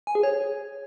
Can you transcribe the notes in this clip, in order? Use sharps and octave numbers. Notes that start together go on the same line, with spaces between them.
G#5
G#4
C#5